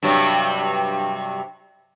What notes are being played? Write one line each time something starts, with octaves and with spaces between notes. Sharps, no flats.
G2 C3 F#3